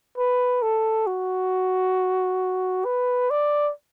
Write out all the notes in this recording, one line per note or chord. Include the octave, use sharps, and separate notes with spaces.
B4
A4
F#4
B4
D5